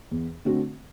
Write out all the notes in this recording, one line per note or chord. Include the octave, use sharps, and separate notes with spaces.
E2
D3 A3 C4 F#4